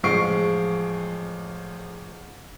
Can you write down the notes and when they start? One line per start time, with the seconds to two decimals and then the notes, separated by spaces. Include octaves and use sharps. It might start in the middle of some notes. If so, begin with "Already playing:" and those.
0.03 A1 F3 G#3 C#6 C7 D7